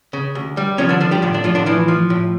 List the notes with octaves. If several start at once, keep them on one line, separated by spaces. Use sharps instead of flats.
C#3
D2
G3
C#3 F3 C#4
D3 D4
D3 F3 D4
G3 G4
A2 D3 D4
D3 D4
A2 F3 F4
D3 D4
E3 F3 E4
F3
A2